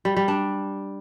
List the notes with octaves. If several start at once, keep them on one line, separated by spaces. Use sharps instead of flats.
G3
G3
D4